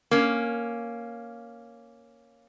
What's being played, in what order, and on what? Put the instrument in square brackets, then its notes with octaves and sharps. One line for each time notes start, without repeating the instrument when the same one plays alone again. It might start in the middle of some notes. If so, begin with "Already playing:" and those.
[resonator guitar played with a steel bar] A#3 C#4